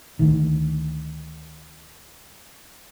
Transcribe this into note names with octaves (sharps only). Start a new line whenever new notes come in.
D2 D#3